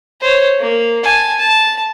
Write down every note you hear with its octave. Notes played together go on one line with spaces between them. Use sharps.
C5 C#5
A#3
G#5 A5
A5